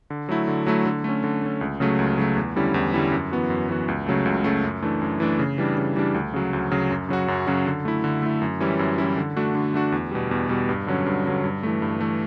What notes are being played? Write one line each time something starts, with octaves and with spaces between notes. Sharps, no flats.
D3
F#3 A3 E4
D3
F#3 A3 E4
D3
A3 C#4
D3
A3 C#4
C#2
C#3 F#3 A3
C#2
C#3 F#3 A3
E2
D3 G3 C#4 E4
E2
D3 G3 C#4 E4
F#2
E3 B3 F#4
F#2
E3 B3 F#4
C#2
C#3 F#3 A3
C#2
C#3 F#3 A3
F#2
E3 A3 D4
F#2
E3 A3 D4
C#3
E3 G3 D4
C#3
E3 G3 D4
D2
C#3 F#3
D2
C#3 F#3
F#2
C#3 F#3 C#4 F#4
F#2
C#3 F#3 C#4 F#4
D3
A3 E4
D3
A3 E4
F#2
E3 G3 C#4 E4
F#2
E3 G3 C#4 E4
D3
A3 D4 F#4
D3
A3 D4 F#4
E2
B2 G3
E2
B2 G3
G2
D3 F#3 C#4
G2
D3 F#3 C#4
G2
E3 A3
G2
E3 A3